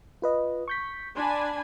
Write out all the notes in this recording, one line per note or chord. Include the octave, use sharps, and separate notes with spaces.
F4 B4 D#5
C#6 G6 B6
D4 G#5 B5 C6